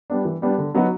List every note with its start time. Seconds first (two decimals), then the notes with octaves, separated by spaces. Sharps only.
0.10 G3 B3 D4
0.25 E3
0.42 G3 B3 D4
0.58 D3
0.74 F#3 B3 D#4 F#4